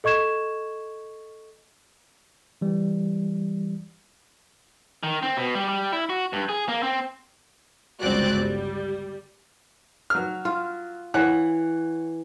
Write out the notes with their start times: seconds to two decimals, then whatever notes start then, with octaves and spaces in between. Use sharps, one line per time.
0.04 A4 D#5 C#6 G#6 E7
2.61 E3 G3
5.03 D#3
5.23 C4
5.37 B2
5.55 G3
5.69 G3
5.92 E4
6.09 F#4
6.33 G2
6.49 G#4
6.68 A#3
6.83 C4
8.01 G1 C#2 C4 F#4 D5 F#6
8.40 G3
10.10 F#3 F6
10.45 F4
11.14 E3 C#5 F#5 F#6